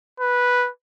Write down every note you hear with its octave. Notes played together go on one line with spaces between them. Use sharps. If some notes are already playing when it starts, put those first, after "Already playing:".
B4